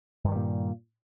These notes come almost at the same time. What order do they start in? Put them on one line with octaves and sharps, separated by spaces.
G2 D#3 G3 A#2